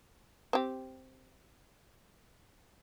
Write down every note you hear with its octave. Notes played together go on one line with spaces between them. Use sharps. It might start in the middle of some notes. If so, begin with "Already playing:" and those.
C4 G4